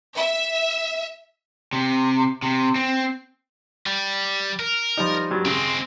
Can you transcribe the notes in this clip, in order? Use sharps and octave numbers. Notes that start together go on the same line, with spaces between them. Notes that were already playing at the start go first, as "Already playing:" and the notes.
E5
C3
C3
C4
G3
A#4
F3 G3 D#4
G2 F#3 G3
C#3 G#3 C4